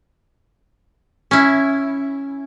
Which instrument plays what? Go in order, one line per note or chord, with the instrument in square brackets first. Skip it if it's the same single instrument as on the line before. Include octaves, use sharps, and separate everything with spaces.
[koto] C#4 E4